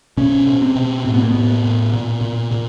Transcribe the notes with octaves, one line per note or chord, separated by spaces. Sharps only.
B2 C#4
B2
C4
B2
A2 C4
B3
A#3
A2 B3
A2
A#2
A#2
A#2